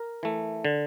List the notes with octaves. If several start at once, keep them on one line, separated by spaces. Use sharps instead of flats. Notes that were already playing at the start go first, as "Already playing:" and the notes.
Already playing: A#4
E3 A3
D3